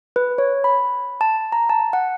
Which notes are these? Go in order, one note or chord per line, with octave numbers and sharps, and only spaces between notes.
B4
C#5
B5
A5
A#5
A5
F#5